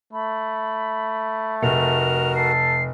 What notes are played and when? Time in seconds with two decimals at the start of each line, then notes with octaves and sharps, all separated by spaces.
0.13 A3 B5
1.63 F1 F#4 A#4 F7
2.35 A4 C7